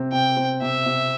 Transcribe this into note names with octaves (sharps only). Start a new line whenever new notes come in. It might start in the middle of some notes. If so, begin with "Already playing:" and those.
Already playing: C3 C4
C3 G5
C4
C3 E5
C3